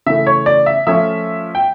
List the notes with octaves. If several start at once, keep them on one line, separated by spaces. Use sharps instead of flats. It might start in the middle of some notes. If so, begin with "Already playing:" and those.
C#3 E3 A3 E5
C#5
D5
E5
F3 A3 C#4 F4 E5
G5